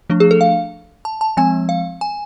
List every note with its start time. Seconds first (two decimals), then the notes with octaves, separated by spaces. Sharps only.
0.10 F3 A3 D4
0.20 G#4
0.31 A4
0.41 F5
1.05 A5
1.21 A5
1.37 F3 G#3 C4 G#5
1.69 F5
2.01 G#5